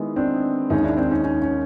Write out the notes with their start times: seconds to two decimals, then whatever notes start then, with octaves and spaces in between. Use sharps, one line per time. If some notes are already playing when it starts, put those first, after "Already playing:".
Already playing: D#3 G#3 B3 E4
0.16 C4 D4
0.70 D#2 D#3 G#3 C#4 D#4
0.84 D4 E4
0.97 C4 D4
1.10 C#4 D#4
1.24 C#4 D#4
1.42 C#4 D#4